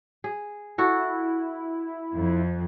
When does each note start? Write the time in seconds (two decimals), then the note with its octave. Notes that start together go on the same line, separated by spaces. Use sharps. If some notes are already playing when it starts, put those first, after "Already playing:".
0.24 G#4
0.78 E4 F#4 A4
2.15 F2